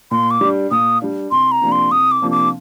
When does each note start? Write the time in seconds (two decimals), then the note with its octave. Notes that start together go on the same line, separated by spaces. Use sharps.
0.11 A#2 C6
0.31 D6
0.41 G3 D4
0.71 A#2 D#6
1.02 G3 D4
1.31 C2 C6
1.52 A#5
1.62 C3 F3 A#3 D4
1.72 C6
1.91 C2 D#6
2.12 D6
2.22 C3 F3 A#3 D4
2.31 D6